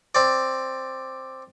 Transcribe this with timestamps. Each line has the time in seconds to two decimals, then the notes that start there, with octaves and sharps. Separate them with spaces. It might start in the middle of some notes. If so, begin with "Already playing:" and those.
0.15 C4 D5